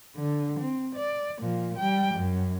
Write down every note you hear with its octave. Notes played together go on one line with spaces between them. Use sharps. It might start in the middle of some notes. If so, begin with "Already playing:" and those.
D3
C4
D5
A#2 F3
G3 G5
F#2